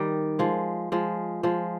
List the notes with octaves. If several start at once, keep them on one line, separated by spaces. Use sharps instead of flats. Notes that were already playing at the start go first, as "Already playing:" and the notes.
Already playing: D#3 G3
F3 G#3
F3 G#3
F3 G#3